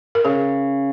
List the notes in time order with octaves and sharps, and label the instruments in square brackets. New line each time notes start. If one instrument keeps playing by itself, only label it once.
[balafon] A#4
[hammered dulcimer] C#3 [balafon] G#4